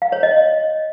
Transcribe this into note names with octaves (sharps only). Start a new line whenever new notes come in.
F5
C#5
D#5